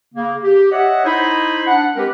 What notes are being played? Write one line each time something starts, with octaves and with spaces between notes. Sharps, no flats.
C#3 A#3
G4
C#5 D#5 E5 F#5
D#4 E4 C5 D#5 B5
D4 F#5
G#3 C4 G4 A#4 B4